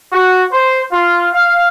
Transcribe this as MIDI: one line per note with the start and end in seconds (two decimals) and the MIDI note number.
0.11 0.44 66
0.51 0.81 72
0.91 1.27 65
1.32 1.67 77